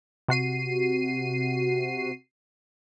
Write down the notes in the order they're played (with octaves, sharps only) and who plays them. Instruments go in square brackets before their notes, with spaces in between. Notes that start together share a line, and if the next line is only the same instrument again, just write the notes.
[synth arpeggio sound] C3 F#4 C7 D#7